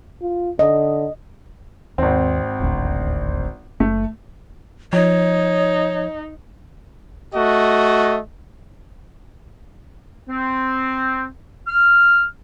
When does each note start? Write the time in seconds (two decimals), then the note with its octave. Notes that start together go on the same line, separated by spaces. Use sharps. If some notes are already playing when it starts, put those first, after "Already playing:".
0.22 F4
0.59 D3 D#5
1.98 G#1 D#2 C4
2.60 D#1 A1 D2
3.80 F#1 A3
4.93 F3 D#4 C#5
7.34 A3 F#4 D#5
10.30 C4
11.68 F6